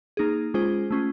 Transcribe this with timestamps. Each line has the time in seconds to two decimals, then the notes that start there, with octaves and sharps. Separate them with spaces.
0.17 A#3 D#4 G#4
0.54 G#3 C#4 F4 G#4 C5
0.91 A3 C#4 F4